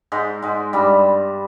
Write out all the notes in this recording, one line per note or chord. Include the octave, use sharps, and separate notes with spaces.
G#2 G#3
G#2 G#3
G2 G3